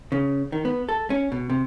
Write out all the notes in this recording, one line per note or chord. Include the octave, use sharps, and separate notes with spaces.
C#3
D#3
B3
A4
C#4
B2
C3